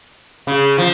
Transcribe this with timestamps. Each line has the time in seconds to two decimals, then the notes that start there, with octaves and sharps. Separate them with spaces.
0.47 C#3
0.78 F3